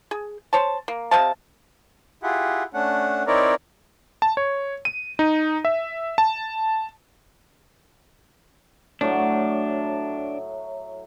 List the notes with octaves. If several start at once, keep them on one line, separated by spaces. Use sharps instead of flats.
G#4
C5 C#5 A5
A#3
C3 D#5 F5 A5
E4 F4 G4 G#4 F#5
A3 C#4 D4 F#5
C4 D#4 E4 A#4 C#5 D5
A5
C#5
D#7
D#4
E5
A5
A2 F#3 D4 C#5